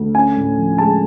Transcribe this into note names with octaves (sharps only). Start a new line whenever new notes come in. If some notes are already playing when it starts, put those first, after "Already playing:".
Already playing: D2
C#4 G#5
A2
F3
G#3 A5